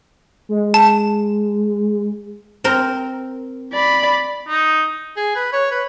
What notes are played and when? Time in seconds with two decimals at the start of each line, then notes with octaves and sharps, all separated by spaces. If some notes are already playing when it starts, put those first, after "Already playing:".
0.49 G#3
0.74 A5
2.64 C4 A#4
3.73 D5 B5
4.48 D#4
5.17 G#4
5.36 B4
5.53 C#5
5.71 B4